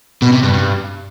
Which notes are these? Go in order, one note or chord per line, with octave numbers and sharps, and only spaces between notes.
B2
C3
G2
G2